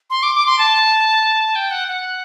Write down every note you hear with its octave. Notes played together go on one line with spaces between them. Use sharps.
C6
D6
D6
C6
A5
G5
F#5
F#5